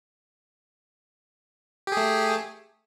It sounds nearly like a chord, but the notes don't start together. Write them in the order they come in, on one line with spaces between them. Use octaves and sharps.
G4 G#4 A3